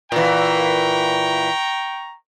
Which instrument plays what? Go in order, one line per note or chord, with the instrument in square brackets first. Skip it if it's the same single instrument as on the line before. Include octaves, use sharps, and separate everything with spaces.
[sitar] A#2 E3 [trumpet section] G5 A#5 C#6